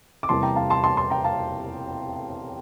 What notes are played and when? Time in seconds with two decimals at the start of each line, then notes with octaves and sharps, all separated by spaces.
0.23 D6
0.29 F1 E2 C3 G3 A#3 A5 C6
0.43 G5 A#5
0.56 F5 A5
0.70 A5 C6
0.84 A5 C6
0.97 A5 C6
1.10 G5 A#5
1.24 F5 A5